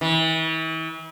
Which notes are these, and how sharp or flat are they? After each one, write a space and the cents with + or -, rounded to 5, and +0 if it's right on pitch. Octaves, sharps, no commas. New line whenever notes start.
E3 -40